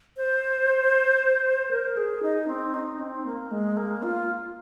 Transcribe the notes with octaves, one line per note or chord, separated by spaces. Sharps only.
C5
A#4
G#4
D#4
C4
D#4
C4
A#3
G#3
A#3
F4